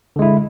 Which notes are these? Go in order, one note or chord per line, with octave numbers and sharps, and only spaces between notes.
D3 G#3 E4